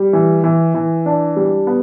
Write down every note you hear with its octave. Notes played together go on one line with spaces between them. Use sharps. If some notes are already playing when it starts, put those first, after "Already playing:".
Already playing: G3
E3
E3
E3
D4
G3
B3